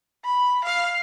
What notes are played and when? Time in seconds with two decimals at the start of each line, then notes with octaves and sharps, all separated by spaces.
0.24 B5
0.64 F5